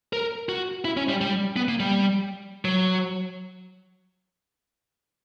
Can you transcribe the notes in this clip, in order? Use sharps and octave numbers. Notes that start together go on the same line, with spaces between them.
A#4
F#4
E4
C#4
G3
G3
B3
A#3
G3
F#3